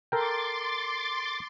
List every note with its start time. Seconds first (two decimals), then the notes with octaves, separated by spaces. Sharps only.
0.12 A4 A#4 G5 C6 D6 A6